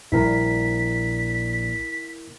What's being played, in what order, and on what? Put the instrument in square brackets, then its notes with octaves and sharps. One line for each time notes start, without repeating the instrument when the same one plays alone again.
[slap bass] A#1 G3 [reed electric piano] E4 A#4 [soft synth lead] B6